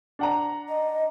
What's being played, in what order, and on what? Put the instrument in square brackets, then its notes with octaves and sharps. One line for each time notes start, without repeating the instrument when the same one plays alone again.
[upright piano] D4 F#5 A#5
[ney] D#5